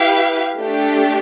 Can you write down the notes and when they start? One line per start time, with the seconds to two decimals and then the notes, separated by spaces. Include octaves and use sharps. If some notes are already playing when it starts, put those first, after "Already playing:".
Already playing: E4 G4 B4 F5
0.59 A3 D4 G4